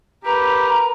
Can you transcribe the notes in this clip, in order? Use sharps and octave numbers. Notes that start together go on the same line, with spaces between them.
G4 A#4 B4 A#5